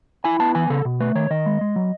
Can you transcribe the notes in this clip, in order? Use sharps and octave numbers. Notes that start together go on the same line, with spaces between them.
E4 G#5
B3 A5
E3 G#5
C#3 A4
B2
A3 B4
D#3 C#5
D#3 D#5
G#3
G#3
F#3